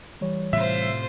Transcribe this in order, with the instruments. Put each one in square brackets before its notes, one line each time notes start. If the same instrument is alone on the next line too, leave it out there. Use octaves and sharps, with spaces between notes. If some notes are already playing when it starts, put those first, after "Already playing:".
[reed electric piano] E3 G3 C#5
[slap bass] A2 C3 [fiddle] F4 C5 [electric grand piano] E5